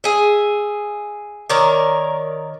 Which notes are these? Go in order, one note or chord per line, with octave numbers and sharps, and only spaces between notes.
G#4 E5
D#3 A#4 C#5 D5